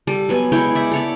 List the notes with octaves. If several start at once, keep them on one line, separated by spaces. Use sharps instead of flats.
G3 A4
F#3 B3 G#5
G#3 E4 C#5 G5
D5 E5 F#5
A4 C#5 D5